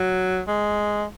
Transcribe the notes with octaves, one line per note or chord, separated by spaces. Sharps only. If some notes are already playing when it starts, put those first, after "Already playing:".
Already playing: F#3
G#3